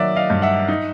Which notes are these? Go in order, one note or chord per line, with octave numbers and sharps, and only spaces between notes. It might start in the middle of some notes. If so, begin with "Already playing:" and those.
Already playing: D#3 F#3 A#3 D5 E5
D#5 F5
G2
E5 F#5
D#4